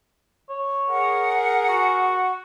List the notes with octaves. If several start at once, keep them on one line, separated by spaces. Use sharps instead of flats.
C#5
G#4 A#4 F#5
F#4